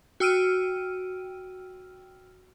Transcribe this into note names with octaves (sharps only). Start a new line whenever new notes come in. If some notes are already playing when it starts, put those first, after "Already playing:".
F#4 G5 E6 F6 D7 D#7